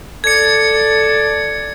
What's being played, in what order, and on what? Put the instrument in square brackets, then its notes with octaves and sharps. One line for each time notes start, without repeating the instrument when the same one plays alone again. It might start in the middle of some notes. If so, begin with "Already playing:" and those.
[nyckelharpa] A4 D5 [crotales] G#6 C#7